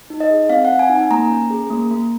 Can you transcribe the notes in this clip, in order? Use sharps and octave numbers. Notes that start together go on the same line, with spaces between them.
D#4
D#5
G#4
C4 F5
F#5
C4
G#5
D#4
G#5
A#3 A#5
C#4
G#4
A#3
A#3